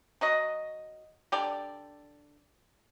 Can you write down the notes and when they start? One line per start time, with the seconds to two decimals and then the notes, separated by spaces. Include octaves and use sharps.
0.21 F#3 F#4 D#5
1.32 D3 G4 D5